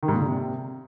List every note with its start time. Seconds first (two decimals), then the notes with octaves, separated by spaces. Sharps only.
0.03 D#3
0.08 G#2
0.14 A#2
0.20 D3
0.26 C3